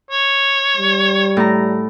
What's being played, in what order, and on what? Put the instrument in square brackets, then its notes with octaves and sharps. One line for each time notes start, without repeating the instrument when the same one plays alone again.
[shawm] C#5
[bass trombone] G3
[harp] A2 A#5